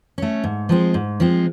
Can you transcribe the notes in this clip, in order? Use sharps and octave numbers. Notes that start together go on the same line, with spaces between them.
A3 C#4
G#2
F3 G#3 C4
G#2
F3 G#3 C4